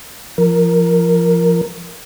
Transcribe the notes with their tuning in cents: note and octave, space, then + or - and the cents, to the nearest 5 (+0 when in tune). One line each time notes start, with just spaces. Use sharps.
F3 -20 A#4 +0